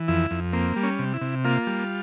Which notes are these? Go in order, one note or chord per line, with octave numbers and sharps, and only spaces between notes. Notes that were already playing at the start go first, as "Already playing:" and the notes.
Already playing: E3
F2 E4
F2
A#3 C4
G3
C#4
C3
E4
C3
A#3 F4
G3